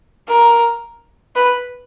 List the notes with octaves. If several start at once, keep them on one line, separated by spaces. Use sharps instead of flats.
A#4
B4